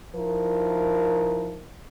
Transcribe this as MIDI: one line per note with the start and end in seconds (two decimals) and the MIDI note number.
0.15 1.64 53
0.15 1.64 63
0.15 1.64 64
0.15 1.64 70